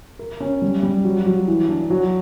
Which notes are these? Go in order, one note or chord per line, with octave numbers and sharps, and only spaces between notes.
A#4
C#4
G3
G3
F#3
F#3
E3
D4
F#3